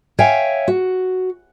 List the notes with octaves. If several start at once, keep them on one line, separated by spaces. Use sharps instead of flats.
C#5 E5 F5 G5 G#5
F#4